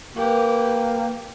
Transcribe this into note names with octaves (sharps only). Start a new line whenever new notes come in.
A#3 G4 B4